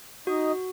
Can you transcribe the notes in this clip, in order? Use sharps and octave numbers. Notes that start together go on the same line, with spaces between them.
D#4 F#4 D#5